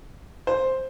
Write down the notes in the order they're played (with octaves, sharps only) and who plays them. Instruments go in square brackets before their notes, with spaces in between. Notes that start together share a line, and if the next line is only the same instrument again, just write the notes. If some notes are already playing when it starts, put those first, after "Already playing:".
[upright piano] C5